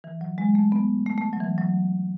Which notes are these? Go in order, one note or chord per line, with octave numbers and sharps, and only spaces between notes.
E3
F#3
G#3
A3
B3
A3
A3
F#3
E3
F#3